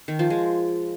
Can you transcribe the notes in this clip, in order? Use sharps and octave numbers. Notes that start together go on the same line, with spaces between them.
D#3
F3
G#3